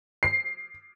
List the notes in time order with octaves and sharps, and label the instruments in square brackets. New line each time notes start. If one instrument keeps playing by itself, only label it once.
[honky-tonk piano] C7